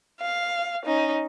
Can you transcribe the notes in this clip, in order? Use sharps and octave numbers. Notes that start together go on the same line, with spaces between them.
F5
C#4 D#4